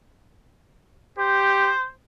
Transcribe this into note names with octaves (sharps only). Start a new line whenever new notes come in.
G4 C5